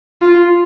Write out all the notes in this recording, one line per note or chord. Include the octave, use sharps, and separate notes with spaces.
F4